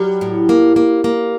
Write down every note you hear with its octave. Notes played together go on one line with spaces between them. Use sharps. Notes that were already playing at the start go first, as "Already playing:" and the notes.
Already playing: F#3 G3
A2
A#3
A#3
A#3